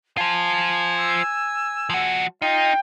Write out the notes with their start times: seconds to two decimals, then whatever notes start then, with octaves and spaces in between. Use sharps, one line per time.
0.17 F4 C5 G#5 A5
0.97 E6
1.90 F3 F#4
2.42 D#4 F4 G5